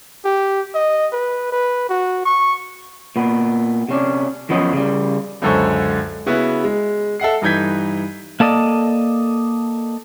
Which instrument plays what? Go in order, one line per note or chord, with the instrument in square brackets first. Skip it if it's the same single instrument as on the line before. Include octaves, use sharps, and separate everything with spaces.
[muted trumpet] G4
D#5
B4
B4
F#4
C#6
[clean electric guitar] A#2 B3
C3 C#4 D4
F#2 F3 B3 C#4 D#5
C#3 G3
[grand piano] C#2 F#2 D3 A4 C5 C#6
C#3 B3 E4 F#4
G#3
A4 E5 F#5 C7
G2 E3 D#4 G6 G#6 B6
[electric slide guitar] A#3 A4 D5 D#5